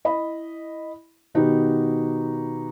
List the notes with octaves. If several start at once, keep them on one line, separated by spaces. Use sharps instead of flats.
E4 D#5 B5
B2 D#3 B3 D#4 F#4 G4